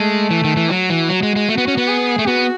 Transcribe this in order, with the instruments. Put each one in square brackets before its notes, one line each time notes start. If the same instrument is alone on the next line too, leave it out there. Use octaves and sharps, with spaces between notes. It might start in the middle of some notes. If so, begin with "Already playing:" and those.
Already playing: [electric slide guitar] G#3 [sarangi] A3
[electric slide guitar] E3
D#3
E3
[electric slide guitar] F#3 [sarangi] F#4
[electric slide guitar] E3
F#3
G#3
G#3
[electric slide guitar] A3 [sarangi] F#4
[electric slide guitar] B3
C#4
B3
[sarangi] G#4
[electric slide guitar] A3
[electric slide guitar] B3 [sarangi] F#4